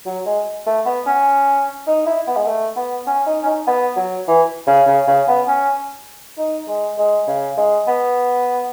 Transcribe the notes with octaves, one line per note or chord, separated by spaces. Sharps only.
F#3
G#3
A3
B3
C#4
D#4
E4
B3
G#3
A3
B3
C#4
D#4
C#4
D#4
B3
F#3
E3
C#3
C#3
C#3
B3
C#4
D#4
G#3
G#3
C#3
G#3
B3